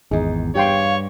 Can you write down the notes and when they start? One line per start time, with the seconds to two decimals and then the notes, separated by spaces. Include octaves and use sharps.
0.11 G#1 E2 D#4 G#4
0.55 G2 G4 C#5 F5 G5 C6